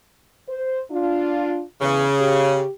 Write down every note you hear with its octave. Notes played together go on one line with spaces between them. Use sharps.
C5
D4 F4
E2 C#3
G4